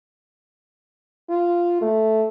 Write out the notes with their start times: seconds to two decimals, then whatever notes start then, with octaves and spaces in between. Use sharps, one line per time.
1.30 F4
1.81 A3